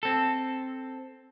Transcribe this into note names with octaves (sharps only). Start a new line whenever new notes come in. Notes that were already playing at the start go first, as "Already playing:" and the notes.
C4 A4